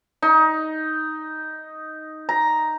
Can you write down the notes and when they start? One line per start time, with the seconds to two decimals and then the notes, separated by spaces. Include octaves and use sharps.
0.22 D#4
2.29 A#5